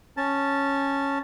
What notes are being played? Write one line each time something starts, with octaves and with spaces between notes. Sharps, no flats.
C#4 A5